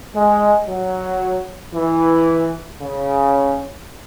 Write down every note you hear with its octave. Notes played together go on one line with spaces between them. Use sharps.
G#3
F#3
E3
C#3